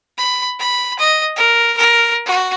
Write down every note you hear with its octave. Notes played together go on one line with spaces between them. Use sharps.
B5
B5
D#5
A#4
A#4
F#4